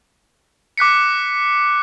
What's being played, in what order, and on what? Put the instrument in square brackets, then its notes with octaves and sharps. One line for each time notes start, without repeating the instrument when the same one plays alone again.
[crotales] D6 F#6 B6 C#7